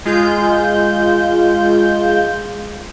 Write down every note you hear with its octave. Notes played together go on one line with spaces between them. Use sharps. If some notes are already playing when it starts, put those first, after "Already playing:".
G#3 F4 G6